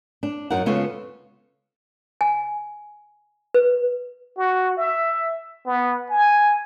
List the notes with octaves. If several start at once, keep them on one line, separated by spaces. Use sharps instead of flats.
D4
F#2 D#4 F#4 A#4 F#5
C#3 G#3 B3 F4 A4 C#5
G#5
B4
F#4
E5
B3
G#5